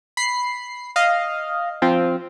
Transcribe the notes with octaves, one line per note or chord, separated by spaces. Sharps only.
B5 C7
D#5 F5
F3 C4 F4